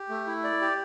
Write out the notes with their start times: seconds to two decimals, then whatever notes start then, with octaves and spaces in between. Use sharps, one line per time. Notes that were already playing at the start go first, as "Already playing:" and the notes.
Already playing: G4
0.09 A3
0.27 E4
0.44 D5
0.61 G4